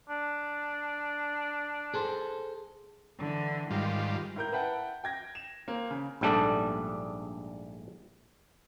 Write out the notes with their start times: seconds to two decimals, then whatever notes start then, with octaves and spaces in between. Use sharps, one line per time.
0.09 D4
1.94 G#4 A4 C5
3.18 D3 E3
3.71 G#2 D#3 G3 G#3 F4
4.36 A2 A#4 G6
4.52 B4 E5 F#5 G5 A5
5.04 G5 G#6 A#6
5.35 E7
5.68 A#3 C4
5.91 C#3
6.21 A#1 G#2 G3 A3 D4 A4